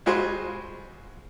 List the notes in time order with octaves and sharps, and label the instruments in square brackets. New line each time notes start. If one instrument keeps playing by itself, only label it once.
[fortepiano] G3 G#3 F4 F#4 G#4 C5